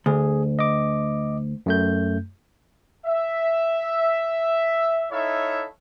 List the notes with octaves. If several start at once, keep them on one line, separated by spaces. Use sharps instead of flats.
D2 G#4
D#5 D6
F#2 A3 G6
E5
D#4 E4 A4 C#5 E5 F5